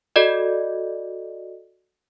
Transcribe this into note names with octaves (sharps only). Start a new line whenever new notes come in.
F#4 A4 D5 D#5